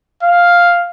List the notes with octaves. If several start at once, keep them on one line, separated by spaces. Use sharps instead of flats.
F5